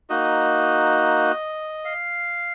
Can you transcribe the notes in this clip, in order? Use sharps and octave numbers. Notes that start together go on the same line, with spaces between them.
A#3 D#4 F#4 D#5
F5